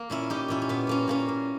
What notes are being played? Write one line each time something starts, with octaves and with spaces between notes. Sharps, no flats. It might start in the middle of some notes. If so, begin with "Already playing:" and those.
Already playing: A#3
A#2 C#4 E4
A#2 D#4 G4
A#2 C#4 E4
C#4
A#2 B3
A#2 A#3 C#4
A#2 A#3 C#4
A#2